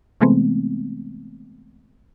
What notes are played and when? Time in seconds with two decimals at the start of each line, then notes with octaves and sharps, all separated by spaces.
0.21 C3 E3 G#3 A3 B3 C4